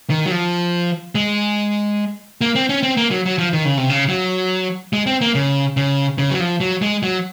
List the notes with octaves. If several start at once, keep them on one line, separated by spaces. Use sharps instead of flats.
D#3
F#3
F3
G#3
A#3
C4
C#4
C4
A#3
F#3
F#3
F3
D#3
C#3
C3
C#3
F#3
G#3
C4
A#3
C#3
C#3
C#3
F#3
F3
F#3
G#3
F#3